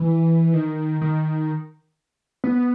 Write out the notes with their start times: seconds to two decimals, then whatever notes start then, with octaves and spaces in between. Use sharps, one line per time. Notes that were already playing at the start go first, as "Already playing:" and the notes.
Already playing: E3
0.54 D#3
1.02 D#3
2.44 B3